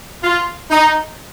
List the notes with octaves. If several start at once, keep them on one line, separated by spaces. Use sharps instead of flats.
F4
D#4